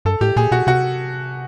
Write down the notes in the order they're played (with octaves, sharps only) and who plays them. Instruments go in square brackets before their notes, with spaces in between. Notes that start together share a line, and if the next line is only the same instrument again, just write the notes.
[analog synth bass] G2 [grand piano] A4
[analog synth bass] A2 [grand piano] G4
[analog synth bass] A#2 [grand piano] G#4
[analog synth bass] B2 [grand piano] F#4
[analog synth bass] C3 [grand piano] F#4